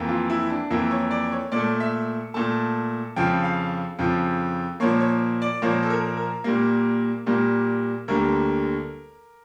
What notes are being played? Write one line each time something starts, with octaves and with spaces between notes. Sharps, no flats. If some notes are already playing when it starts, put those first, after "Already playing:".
Already playing: F2 E3 A#3
F4
E4
D4
F2 E3 A#3 E4
C#5
D5
C#5
A#2 A3 D5
E5
A#2 A3 A5
F2 C#3 F3 G5
F5
F2 C#3 F3
A#2 F3 A#3 C#5
C#5
D5
A#2 F3 A#3 C#5
A4
A#4
A#4
A#2 G3 A#3
A#2 G3 A#3
D2 D3 G3 A#3 A#4